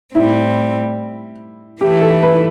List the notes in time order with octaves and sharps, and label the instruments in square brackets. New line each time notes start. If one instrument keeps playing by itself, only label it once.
[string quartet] A2 G3 C4 [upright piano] E4
[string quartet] E3 A3 E4 [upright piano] G4
[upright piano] A4
B4